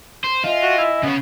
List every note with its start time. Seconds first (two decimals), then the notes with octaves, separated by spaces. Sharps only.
0.24 C5
0.44 F4 D#5 E5 G#5
0.63 F#4
0.78 E4
1.03 C#3 B3 C#5